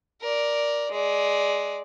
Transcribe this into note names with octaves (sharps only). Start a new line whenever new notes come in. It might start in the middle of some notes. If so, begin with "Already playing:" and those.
A#4 D5
G#3 D5